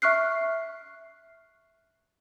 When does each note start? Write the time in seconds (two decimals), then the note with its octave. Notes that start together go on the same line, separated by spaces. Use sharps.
0.02 E5 C#6 F6 F#6 C7